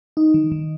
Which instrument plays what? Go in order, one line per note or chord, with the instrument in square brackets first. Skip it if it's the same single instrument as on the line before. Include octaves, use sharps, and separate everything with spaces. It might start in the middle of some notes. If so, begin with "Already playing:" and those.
[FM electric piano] D#4
D#3
D#3